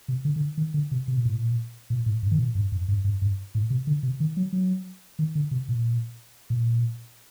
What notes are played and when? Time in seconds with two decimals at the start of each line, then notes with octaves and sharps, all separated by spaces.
0.08 C3
0.25 D3
0.36 D3
0.57 D#3
0.74 D3
0.91 C3
1.08 C3
1.17 A#2
1.25 A2
1.35 A#2
1.90 A#2
2.06 A2
2.23 G2
2.31 D#3
2.39 A#2
2.55 G2
2.72 F#2
2.88 G2
3.04 G2
3.22 G2
3.55 A2
3.70 C3
3.87 D3
4.03 C3
4.20 D#3
4.37 F#3
4.53 F#3
5.19 D#3
5.35 D3
5.51 C3
5.69 A#2
6.50 A#2